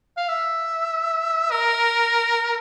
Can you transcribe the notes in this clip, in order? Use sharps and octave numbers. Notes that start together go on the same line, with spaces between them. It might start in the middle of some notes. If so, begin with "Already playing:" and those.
F5
E5
A#4